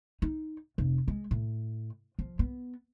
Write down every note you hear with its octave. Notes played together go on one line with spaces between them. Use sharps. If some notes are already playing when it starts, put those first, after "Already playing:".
D#4
F1
G#3
A2
F3
B3